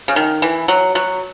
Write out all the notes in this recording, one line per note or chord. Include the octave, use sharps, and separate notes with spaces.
C#3
D#3
E3
F#3
F#3